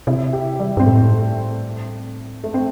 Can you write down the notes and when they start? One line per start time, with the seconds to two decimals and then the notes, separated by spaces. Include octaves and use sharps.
0.07 C3 E4
0.33 G4
0.60 G3
0.77 G2 C4
0.86 A2 A3
2.44 G2 A3
2.54 C4